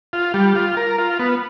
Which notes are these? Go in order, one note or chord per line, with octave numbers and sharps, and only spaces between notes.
F4
G3
F4
A#4
F4
B3